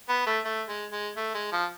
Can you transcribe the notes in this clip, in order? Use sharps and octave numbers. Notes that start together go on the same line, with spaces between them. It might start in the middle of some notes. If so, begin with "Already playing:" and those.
B3
A3
A3
G#3
G#3
A3
G#3
F3